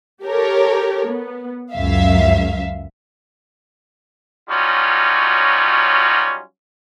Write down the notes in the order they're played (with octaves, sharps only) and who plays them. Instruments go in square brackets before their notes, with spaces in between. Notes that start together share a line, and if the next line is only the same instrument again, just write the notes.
[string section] G4 A4 A#4 C#5
B3
C#2 F#2 E5 F5
[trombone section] F#3 G3 C#4 D#4 F4 F#4